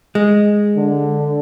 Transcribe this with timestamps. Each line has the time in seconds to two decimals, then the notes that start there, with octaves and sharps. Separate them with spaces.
0.15 G#3
0.77 D3